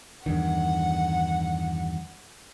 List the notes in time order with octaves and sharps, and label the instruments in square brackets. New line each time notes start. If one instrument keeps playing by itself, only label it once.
[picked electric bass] E2 G2 D#3 [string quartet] F#5